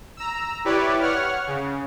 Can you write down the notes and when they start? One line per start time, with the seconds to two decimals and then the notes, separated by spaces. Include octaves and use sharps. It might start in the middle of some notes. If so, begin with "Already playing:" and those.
0.17 A#5 E6
0.64 E4 G4 B4 C#5 D5
1.00 C#5 F#5 F6
1.47 C#3